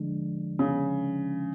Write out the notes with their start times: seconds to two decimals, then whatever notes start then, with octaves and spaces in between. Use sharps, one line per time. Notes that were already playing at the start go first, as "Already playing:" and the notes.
Already playing: D3 F3 G#3 D4
0.59 C#3